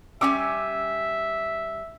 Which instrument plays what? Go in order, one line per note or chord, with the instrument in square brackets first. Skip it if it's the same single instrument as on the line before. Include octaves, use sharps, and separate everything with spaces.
[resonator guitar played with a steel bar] G3 C#4 G#5 [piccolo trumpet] E5 [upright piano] D6 E6